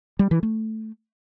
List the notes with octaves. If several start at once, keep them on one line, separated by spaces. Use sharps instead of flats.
G3
E3
A3